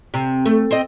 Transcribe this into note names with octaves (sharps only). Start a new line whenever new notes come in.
C3
A3
C4 D#5